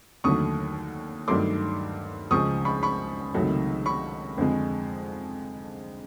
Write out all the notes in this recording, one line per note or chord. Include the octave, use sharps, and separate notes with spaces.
D#2 D3 F#3 A3 C#6 D#6
G2 D#3 F#3 A3 C6 D6
C#2 C#3 F3 G#3 C#6 D#6
B5 C#6
B5 C#6
C#2 C3 D#3 F#3 A3
B5 C#6
F2 D3 F3 G#3